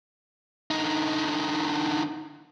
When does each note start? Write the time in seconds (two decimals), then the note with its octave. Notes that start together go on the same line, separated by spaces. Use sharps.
0.71 D3 D#4